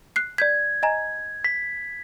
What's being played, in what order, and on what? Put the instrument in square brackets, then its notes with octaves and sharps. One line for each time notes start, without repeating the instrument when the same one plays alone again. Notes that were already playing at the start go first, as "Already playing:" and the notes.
[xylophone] F#6 C7
[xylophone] D5 G6 B6 [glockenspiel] G#6
[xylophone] D#5 G#5 A#5
[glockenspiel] B6